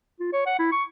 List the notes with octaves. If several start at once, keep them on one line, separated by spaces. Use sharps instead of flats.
F4
C#5
F#5
E4
C#6